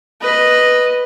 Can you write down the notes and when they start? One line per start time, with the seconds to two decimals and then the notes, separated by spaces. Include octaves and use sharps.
0.21 B4 D#5